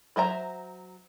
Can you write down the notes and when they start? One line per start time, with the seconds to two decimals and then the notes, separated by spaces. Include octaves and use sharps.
0.16 F#3 C5 E5 A#5